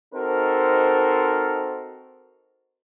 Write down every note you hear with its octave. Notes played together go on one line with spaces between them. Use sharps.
C4 D#4 F#4 A4 A#4 C5